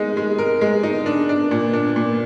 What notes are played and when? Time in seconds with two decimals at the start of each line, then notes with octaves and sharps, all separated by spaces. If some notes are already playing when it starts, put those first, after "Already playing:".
Already playing: G#3 D#4
0.17 G#3
0.39 A#4
0.61 G#3
0.83 D#4
1.06 D4
1.29 D4
1.51 A#2
1.73 D4
1.96 A#2